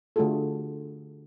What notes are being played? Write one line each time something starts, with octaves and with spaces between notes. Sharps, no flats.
D3 A3 F4 F#4 G#4 A4